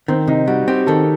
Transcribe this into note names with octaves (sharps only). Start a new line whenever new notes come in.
D#3 C4
C3 D#4
G3 F#4
C4 G4
D#3 A4